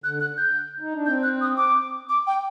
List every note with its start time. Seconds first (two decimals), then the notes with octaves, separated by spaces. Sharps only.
0.04 D3 F#6
0.20 F#6
0.37 G6
0.80 D#4
0.94 D4
1.06 C4 G6
1.23 F#6
1.41 D#6
1.57 D6
2.09 D6
2.27 G5